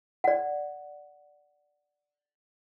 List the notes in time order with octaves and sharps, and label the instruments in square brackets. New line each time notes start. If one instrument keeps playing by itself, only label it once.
[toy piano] D5 F#5